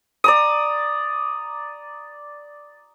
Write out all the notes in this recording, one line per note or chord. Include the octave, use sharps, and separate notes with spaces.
D5 A#5 D#6